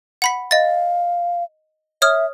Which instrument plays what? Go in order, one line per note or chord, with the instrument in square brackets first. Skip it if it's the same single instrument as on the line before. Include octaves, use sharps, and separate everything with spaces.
[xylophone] F#5 B5 B6
[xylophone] D#5 A6 [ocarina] F5
[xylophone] C#5 D#6 F6 [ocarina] E5